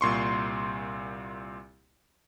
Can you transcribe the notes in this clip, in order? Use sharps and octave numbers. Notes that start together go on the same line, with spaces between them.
C2 A#2 C6 C#6